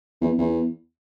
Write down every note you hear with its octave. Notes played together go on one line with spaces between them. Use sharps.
E2
E2